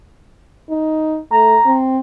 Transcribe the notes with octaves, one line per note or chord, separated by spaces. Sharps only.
D#4
A3 A#5
C4